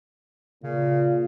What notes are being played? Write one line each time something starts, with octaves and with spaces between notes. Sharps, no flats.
A#2 C#3